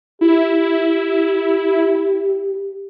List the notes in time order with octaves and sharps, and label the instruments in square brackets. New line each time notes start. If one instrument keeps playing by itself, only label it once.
[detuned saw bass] E4 [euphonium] G4